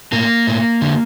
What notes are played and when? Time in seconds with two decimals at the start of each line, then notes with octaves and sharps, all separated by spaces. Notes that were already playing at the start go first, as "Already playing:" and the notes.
0.12 A2 A#3
0.47 A2
0.82 D3